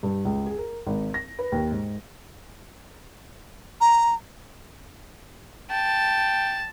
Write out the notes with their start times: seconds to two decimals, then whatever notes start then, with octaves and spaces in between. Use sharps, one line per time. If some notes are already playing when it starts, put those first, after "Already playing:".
0.03 G2
0.25 C#2
0.46 G#4
0.58 A#4
0.87 G#1
1.14 A#6
1.39 B4
1.52 D#2
1.72 G#2
3.81 A#5
5.71 G5 A5